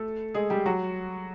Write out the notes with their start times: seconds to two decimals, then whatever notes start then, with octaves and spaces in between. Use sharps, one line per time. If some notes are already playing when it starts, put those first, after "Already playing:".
Already playing: A3 A4
0.34 G#3 G#4
0.50 G3 G4
0.66 F#3 F#4